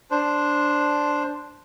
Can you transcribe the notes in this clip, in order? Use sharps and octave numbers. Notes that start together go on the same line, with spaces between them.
D4 C5